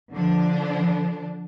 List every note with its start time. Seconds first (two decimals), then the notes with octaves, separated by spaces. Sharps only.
0.13 D3 F3 D4